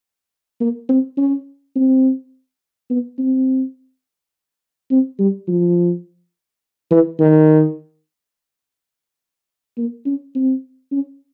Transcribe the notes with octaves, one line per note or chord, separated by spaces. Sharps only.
A#3
C4
C#4
C4
B3
C4
C4
G3
F3
E3
D#3
A#3
C#4
C4
C#4